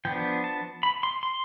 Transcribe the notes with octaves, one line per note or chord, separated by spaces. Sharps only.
F3 B3 D4 G5
A5
B5
C6
C6